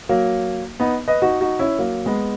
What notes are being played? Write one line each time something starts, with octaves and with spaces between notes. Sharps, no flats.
F#3 A#3
B3 D#4
B4 D#5
D#4 F#4
D#4 F#4
C#4 E4
F#3 A#3
G#3 B3